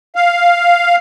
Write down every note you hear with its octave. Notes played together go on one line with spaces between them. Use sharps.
F5